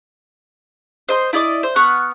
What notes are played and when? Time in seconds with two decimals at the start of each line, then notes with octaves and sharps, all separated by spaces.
1.09 C5 D#5 C6
1.33 E4 D5 D#5 D6
1.63 C5
1.76 B3 F#5 C#6 F6